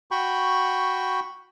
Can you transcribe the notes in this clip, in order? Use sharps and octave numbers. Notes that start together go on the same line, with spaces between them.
F#4 G5 B5 C#6